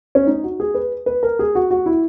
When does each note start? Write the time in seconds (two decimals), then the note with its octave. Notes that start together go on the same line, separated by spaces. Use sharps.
0.15 C#4
0.27 D#4
0.44 F#4
0.60 G#4
0.74 B4
1.06 B4
1.23 A#4
1.39 G#4
1.55 F#4
1.71 F#4
1.86 E4